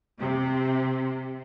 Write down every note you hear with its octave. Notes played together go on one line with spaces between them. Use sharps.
C3